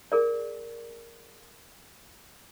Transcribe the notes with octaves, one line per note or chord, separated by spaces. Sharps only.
G#4 A#4 D5